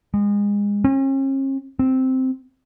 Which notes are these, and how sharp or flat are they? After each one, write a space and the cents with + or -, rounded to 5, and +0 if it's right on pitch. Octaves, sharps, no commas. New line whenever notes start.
G#3 -30
C#4 -45
C4 -5